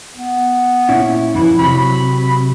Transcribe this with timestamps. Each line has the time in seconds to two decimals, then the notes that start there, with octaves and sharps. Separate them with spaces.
0.16 B3
0.89 A#2 C#4 E4
1.35 F2 E3 E4
1.59 C3 F#3 B5